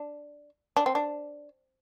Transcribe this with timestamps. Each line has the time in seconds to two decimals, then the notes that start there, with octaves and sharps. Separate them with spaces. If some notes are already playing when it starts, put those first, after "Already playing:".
Already playing: D4
0.76 D4
0.86 C4
0.95 D4